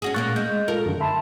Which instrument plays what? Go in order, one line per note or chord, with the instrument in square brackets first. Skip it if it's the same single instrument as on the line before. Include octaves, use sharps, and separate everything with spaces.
[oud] C#4 F#4 G#4
[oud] A#2 A#3 C#4 [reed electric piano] C#6 F#6 A6
[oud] G#3 [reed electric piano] G6
[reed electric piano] F4 A4 [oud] A#4
[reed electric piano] F#2 D3 D#3
[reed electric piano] E5 B5 C6 [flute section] A5